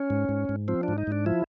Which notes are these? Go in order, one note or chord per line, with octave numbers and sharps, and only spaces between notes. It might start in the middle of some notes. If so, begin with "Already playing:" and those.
Already playing: C#4
G#2
G#2
G#2
F3 C4
G#2 D4
D#4
G#2 D4
F3 E4